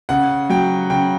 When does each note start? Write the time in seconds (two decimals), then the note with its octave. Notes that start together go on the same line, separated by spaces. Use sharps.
0.09 C#3 F#5
0.50 F#3 G5
0.90 C#3 G5